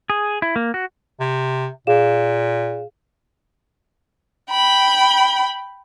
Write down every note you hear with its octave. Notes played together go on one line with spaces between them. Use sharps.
G#4
E4
A#3
F#4
C3
A#2 G#4 F5 E7
G5 B5